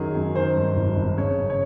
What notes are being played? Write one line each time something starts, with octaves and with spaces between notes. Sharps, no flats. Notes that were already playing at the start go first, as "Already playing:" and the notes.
Already playing: F#2 D#3 F#3 G#4
F#2
D#3 C5
G2
G#1
G#1
C#3 C#5
F#2
C#5